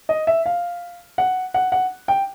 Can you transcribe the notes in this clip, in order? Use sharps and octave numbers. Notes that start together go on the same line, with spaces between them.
D#5
E5
F5
F#5
F#5
F#5
G5